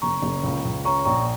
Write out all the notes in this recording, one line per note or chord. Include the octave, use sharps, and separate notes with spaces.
F#1 A#5 C#6
F#1
C#2
C#2
C#4 A#5 C#6
A#1 A#5 C#6